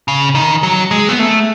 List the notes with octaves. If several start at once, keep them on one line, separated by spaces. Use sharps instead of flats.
C#3
D#3
F#3
G#3
B3
A3